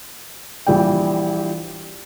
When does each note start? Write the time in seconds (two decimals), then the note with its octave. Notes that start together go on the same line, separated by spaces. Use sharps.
0.67 A#1 E3 G3 D5 G5